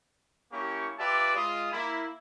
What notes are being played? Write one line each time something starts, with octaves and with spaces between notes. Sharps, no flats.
A#3 C#4 E4 G4 C#6
F4 G4 B4 D5 E5 A5
G#3 F4 D#6
A#3 E4